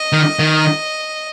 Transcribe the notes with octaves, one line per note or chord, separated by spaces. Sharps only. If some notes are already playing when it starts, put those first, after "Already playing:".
Already playing: D#5
D#3
D#3